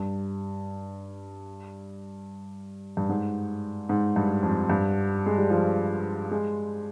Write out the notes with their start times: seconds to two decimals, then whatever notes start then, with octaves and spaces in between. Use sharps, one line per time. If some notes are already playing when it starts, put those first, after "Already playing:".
Already playing: G2
2.97 G2
3.09 G#2
3.89 G#2
4.16 G2
4.43 F2
4.70 G2
5.26 G#3
5.38 G3
5.50 F3
6.31 G#3